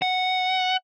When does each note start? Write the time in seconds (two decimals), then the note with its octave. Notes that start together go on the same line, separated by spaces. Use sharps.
0.02 F#5